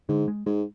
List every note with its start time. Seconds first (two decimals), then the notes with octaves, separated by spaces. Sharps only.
0.09 G#2 D3
0.28 G#3
0.46 G#2 G#3